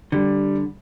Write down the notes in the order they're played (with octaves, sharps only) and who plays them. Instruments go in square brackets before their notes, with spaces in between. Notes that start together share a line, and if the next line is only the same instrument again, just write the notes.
[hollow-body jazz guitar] D3 [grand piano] G3